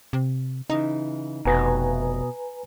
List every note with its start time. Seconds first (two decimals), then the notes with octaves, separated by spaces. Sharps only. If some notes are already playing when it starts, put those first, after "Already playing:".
0.13 C3
0.70 C#3 E3 D#4
1.45 F1 B2 F#4 B4 D#5 G#5 A#5